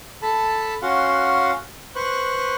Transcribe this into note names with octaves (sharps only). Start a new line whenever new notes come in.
A4 A5 B5
C#4 F#4 F5 F#5 C6
B4 C5 C#6 F#6